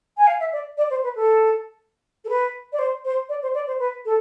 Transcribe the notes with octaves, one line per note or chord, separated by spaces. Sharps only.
G#5
F5
E5
D5
D5
C5
B4
A4
A4
B4
D5
C5
C5
D5
C5
D5
C5
B4
A4